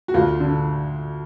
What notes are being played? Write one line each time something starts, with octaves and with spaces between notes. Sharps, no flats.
F#4
D2 F4
D3